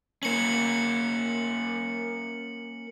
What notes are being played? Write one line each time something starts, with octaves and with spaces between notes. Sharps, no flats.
A#3 C#4 C#7 F#7